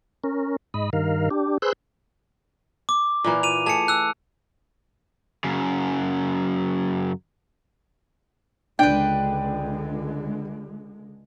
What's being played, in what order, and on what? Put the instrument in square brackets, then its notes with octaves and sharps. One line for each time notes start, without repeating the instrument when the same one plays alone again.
[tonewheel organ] C#4 A#4
G#2 D#5 B5
G2 D#3 A#4 F5
D4 G4
G#4 B4 C5 E6 F#6 G6
[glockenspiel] D6
[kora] A#2 E3 A#3
[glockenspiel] D#7 F7
[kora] A3 G#4 [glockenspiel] A5 C#7
[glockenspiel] E6 F#6
[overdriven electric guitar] F#2 C#3
[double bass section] C#2 D3 G#3 [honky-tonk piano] D4 [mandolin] B4 G5